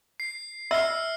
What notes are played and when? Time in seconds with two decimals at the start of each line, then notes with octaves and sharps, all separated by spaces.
0.20 C7
0.71 E5 E6 F6 C7